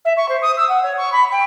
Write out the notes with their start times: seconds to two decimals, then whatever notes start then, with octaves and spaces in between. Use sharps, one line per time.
0.05 E5
0.17 C#6
0.28 C5
0.42 D#6
0.57 E6
0.68 F#5
0.82 C#5
0.97 C#6
1.12 B5
1.31 G5